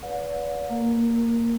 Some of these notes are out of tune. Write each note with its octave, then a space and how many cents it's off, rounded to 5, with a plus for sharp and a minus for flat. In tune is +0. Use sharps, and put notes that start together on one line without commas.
B4 +0 D5 -35 F5 +45
A#3 -10 A#4 +0